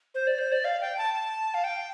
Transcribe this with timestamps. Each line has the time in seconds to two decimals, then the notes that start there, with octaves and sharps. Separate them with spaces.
0.15 C5
0.27 D5
0.39 C5
0.52 D5
0.65 F5
0.81 G5
0.98 A5
1.14 A5
1.54 F5
1.64 G5